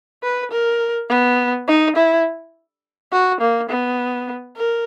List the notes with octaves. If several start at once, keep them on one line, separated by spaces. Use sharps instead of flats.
B4
A#4
B3
D#4
E4
F#4
A#3
B3
A#4